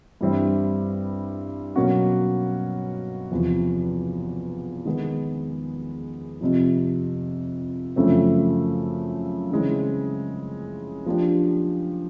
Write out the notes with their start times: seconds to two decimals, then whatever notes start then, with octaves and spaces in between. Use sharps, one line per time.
0.21 G2 E3 G3 C4 E4
1.76 B2 F#3 A#3 C#4 F#4
3.31 E2 C3 F3
4.85 D#3 G#3 B3
6.41 F2 C3 F3
7.96 F#2 C#3 F3 A3 C4
9.51 C#3 E3 G#3 C4
11.06 F3 A#3 D4 G4